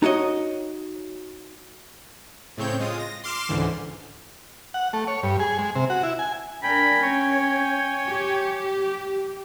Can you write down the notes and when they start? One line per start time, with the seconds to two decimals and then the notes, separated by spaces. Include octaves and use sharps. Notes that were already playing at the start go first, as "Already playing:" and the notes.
0.03 D#4 F#4 C#5 D#5
2.57 A2 C#3 C4 C#5 G6
2.80 G#3 F4 D#6
2.99 A#6
3.24 C6 D6 F6 C7 E7
3.49 C#2 G#2 D3 E3
4.74 F#5
4.93 A3
5.07 C#5
5.23 G2
5.40 G#4
5.59 G#3
5.75 C3
5.90 F#4
6.03 E4
6.19 G#5
6.63 D4 A#4 G5 G#5 B5
7.03 C#4 C#5
8.06 G4